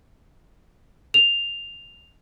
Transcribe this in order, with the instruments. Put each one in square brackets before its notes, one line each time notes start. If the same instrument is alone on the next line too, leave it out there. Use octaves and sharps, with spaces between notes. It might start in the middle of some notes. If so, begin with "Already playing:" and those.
[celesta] F7